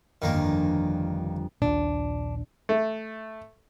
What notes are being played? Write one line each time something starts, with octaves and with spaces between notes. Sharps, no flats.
G1 F2 D#3 A#3
A#1 D#2 A#2 D4
A3